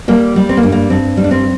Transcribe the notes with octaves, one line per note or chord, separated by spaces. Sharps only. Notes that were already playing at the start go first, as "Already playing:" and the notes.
G3 A#3
G3
C4
A#3
G2
A#3
G2 C4
G3
D4
C4